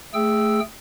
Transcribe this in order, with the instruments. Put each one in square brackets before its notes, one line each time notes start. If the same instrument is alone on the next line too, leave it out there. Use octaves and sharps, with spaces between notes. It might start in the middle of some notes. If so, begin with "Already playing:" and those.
[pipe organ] A3 G#4 G5 E6